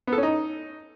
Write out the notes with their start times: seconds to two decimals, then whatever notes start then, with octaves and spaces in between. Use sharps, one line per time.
0.07 B3
0.13 A4
0.18 C#4
0.23 D#4